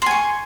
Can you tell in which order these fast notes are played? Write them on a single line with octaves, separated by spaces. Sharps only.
C6 G#5 C#6